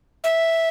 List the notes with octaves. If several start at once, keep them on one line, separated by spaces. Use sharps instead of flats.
E5